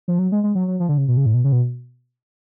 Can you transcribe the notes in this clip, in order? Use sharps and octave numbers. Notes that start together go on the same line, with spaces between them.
F3
F#3
G#3
G#3
F#3
F#3
F3
D3
C#3
B2
C#3
A2
B2
C#3
B2